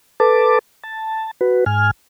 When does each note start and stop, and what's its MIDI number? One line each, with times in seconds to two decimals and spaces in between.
0.20 0.59 69
0.20 0.59 71
0.20 0.59 81
0.20 0.59 86
0.84 1.31 81
1.41 1.64 66
1.41 1.64 71
1.66 1.91 44
1.66 1.91 80
1.66 1.91 89